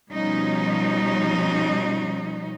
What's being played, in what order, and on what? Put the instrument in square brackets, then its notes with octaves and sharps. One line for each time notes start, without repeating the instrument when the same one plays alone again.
[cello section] B2 F3 G3 C#4 D#4